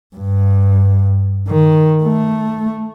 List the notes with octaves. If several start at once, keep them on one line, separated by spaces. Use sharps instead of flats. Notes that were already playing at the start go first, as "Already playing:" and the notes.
G2
D#3
A3